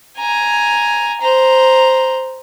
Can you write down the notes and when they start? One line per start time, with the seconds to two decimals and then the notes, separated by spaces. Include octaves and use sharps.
0.18 G#5 A#5
1.21 C5 A#5